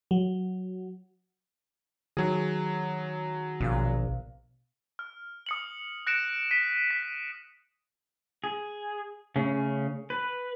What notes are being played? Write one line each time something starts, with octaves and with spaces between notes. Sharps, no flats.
F#3
D#3 F#3 G#4
A#1 B2 F5
F6
D#6 C#7 F#7
F#6 A#6 C#7 D7 E7
B6 D#7
B6
G#4
C#3 A3 C#4
B4